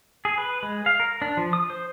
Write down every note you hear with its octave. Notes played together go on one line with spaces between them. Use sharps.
G#4
B4
G#3
F5
A#4
D4
F3
D#6
C5